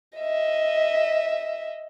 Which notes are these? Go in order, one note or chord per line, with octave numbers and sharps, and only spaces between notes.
D#5 E5